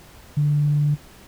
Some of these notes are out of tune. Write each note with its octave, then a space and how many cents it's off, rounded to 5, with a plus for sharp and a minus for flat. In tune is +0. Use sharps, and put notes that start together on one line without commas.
D3 +0